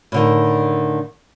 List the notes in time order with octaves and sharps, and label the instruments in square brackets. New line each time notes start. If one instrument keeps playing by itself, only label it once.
[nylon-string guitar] A2 D3 D#3